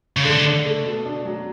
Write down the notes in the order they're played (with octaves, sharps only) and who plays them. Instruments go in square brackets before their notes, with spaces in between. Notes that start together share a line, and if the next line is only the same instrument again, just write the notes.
[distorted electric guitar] C#3
[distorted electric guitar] D3 [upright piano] A3
[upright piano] D4
A3
B2
D4
F#3